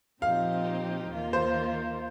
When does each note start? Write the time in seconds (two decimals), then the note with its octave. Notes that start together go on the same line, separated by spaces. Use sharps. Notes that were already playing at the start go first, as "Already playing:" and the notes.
0.22 A#2 F3 C4 D#4 G4 F5
1.10 D#2 D#3 A#3 F4 A#4
1.33 C5